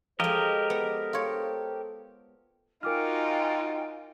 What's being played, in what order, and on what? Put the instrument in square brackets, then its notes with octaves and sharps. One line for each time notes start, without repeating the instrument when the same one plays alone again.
[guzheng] F3 G#3 [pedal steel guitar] G4 A#4 D#5 [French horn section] A4 C5
[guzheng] B3
F4 C#5
[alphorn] D#4 [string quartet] F4 [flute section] F#4 G5 G#5 [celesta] A#4 D6 F6